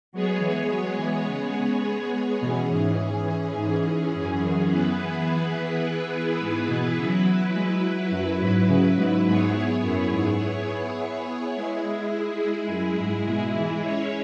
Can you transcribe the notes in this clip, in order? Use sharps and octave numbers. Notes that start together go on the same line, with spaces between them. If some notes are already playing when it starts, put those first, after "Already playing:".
F#3 G#3 B3 G#4 C#5
E3
F#3
E3
C#3
B2 E3 C#4 G#4
G#2
G#2
F#2
E3 B3 E4 G#4 B4
G#2
B2
C#3 F#3 E4 B4
G#3
F#2
G#2
C#3
G#2
G#2 B3 E4 G#4 C#5
F#2
G#2
G#3 E4 G#4
F#2
G#2
B2
E3
G#3 C#4 E4 C#5